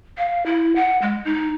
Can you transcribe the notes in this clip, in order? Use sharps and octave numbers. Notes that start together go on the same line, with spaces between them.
F5
E4
F#5
G#3
D#4